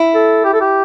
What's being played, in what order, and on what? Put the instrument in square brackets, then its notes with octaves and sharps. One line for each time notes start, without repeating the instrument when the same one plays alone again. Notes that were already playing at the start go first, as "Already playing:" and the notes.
Already playing: [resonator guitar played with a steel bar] E4
[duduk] A4
G4
A4
G4